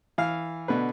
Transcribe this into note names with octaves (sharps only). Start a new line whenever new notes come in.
E3 F5 F6
B2 D3 B4